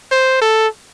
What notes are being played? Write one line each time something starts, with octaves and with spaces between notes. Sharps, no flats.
C5
A4